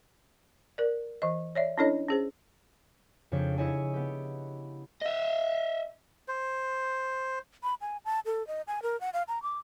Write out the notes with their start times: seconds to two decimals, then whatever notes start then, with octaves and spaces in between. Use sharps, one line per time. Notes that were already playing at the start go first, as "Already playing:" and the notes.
0.78 A#4 D5
1.22 E3 D#5
1.55 C#5 D5 E5
1.78 C#4 D4 E4 A4 C#5 D#5
2.09 C#4 G#4 C5
3.32 F2 C#3 D4 G4 C#5
3.58 E4 C#5 D#5 G#5
3.93 B3 G4
5.02 D#5 E5
6.28 C5
7.63 B5
7.81 G#5
8.05 A5
8.26 A4
8.47 D#5
8.67 G#5
8.83 A#4
9.01 F#5
9.13 F5
9.28 A#5
9.43 D6